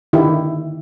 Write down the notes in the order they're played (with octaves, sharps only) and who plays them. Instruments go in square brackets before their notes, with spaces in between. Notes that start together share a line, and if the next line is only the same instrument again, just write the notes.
[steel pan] D3 D#3 E4 G4